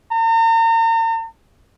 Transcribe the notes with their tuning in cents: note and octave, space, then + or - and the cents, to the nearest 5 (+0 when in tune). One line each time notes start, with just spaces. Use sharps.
A#5 -40